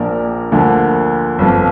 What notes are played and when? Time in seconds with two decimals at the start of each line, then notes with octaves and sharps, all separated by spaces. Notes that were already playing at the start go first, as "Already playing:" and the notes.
Already playing: A#1 A#2 F3 D4 A#4
0.52 D2 D3 F3 A#3
1.39 G1 F2 F3